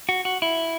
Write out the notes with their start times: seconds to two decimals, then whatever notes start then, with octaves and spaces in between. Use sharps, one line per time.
0.09 F#4
0.25 F#4
0.42 E4